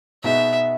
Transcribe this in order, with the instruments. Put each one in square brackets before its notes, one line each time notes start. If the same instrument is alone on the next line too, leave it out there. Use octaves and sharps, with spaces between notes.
[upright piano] B2 G#3 B3 D#4 F#4 [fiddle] E5